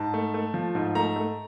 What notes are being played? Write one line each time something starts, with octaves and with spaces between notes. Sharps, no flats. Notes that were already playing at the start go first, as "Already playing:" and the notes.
Already playing: G#2 A5
A3
A3
F3
G#2
A3 A#5
A3